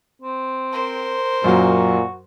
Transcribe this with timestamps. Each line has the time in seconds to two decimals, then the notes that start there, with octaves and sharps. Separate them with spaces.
0.22 C4
0.71 A#4 C5
1.44 F#2 A#2 F#3 F#4